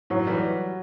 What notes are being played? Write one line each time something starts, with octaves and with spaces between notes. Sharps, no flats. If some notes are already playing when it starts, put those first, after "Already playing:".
A2 F#3
E3 G3